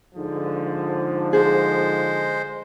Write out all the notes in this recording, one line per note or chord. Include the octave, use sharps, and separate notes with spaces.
G#2 D3 F3
G#3 G#4 C5